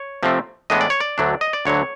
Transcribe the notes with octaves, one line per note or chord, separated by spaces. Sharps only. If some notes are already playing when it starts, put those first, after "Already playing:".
Already playing: C#5
C3 F3 A3 C4
A2 E3 G#3 B3 D4 D#5
D5
C#5
D5
D2 D3 F#3 A3 D4
D#5
D5
D2 D3 F#3 C#5